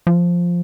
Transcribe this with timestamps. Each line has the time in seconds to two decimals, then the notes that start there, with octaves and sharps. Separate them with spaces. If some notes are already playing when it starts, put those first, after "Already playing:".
0.07 F3